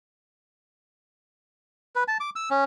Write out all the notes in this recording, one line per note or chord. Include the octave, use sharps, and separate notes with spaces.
B4
A5
D6
E6
C#4